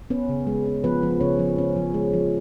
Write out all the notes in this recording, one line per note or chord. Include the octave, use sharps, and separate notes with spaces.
B3 C#4 B4
C#3
G#3
C#4
F3 B3 B4
F3
C#3 C#4 C#5
F3
C#4
F3
G#3
F3